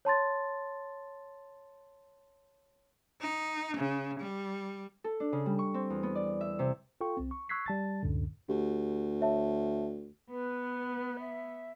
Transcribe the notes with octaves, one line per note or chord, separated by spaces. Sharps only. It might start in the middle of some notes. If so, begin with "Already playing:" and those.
C#5 A5 C6 A6
D#4
C#3
G3
A4
D4
C#3
G3
C#6
C4
E2
B3
D5
E5
C3
F4 A4 G5 C#6
C2 C4
C#6
C#6 E6 F#6 G#6 B6 C7
G3 A5 A6
C#2 F#2 A2 D3
D2 G4
C#5 E5 A5
B3 B4
E5